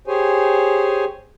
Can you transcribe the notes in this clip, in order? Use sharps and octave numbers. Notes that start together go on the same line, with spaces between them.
G4 G#4 C5 C#5 G#5